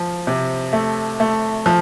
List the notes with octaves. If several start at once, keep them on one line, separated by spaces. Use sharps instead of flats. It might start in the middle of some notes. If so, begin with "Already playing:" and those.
Already playing: F3
C3
A3
A3
F3